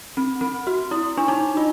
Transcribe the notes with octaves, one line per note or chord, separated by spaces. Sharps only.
C4
C4
F#4
E4
D4
D#4
F4